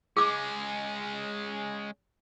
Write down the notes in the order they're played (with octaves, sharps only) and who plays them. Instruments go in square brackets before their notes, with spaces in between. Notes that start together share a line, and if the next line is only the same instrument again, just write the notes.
[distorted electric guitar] G#3 C#4 [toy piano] G#4 D6